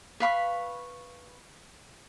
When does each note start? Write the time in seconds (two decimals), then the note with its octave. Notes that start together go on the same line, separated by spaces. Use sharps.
0.20 B4 F5 B5 C#6